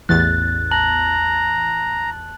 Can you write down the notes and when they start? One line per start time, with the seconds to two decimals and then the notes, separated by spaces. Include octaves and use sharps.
0.09 A1 E2 F#6 A6
0.71 A5 A#5 F#6 F#7